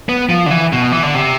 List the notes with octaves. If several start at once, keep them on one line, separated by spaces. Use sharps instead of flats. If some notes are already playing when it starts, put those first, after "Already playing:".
B3
F3
D3
E3
B2
E3
D3
C3